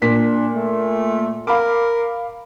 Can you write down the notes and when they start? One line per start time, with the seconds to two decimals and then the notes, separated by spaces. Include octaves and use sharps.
0.02 A#2 D4 B6
0.52 A3
1.47 A#4 F5 B5 D6